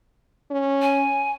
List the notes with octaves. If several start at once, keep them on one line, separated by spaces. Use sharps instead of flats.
C#4
G#5